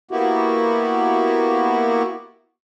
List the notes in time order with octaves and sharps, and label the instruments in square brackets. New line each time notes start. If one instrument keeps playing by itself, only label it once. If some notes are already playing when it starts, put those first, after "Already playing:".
[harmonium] A#3 B3 E4 F#4 G4